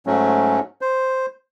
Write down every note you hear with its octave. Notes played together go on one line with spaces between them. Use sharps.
G#2 F#3 A3 C#4
C5